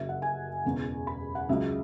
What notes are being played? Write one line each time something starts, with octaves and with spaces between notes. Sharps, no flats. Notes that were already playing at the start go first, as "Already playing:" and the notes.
Already playing: F#1 F#2 F#3 E5
F#5
G#5
E1 E2 C#3
B5
F#5
C#2 C#3 F#3 E5